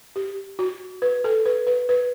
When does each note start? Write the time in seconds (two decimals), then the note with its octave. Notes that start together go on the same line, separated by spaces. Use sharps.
0.16 G4
0.59 F#4
1.02 B4
1.24 A4
1.46 B4
1.67 B4
1.89 B4